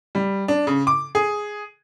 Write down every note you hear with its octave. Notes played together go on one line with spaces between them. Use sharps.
G3
D4
C#3
D6
G#4